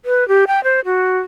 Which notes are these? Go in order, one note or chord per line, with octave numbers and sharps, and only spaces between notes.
B4
G4
G5
C5
F#4